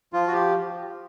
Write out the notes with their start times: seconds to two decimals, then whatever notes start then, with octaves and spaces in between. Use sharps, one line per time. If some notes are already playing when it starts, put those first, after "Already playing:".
0.13 F3 F4
0.27 F#4
0.33 G4